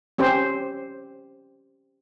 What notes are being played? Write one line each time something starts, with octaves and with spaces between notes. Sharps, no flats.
C4 C#4 G4 C5